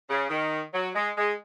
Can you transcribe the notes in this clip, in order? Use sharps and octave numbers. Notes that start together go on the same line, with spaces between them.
C#3
D#3
F#3
G#3
G#3